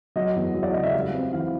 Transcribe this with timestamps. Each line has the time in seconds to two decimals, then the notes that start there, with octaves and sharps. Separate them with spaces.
0.16 F#3 D#5
0.36 E2
0.54 F#3
0.63 D5
0.73 C#3 D#5
0.83 E5
0.93 G3 F5
1.14 C4
1.33 E3 F5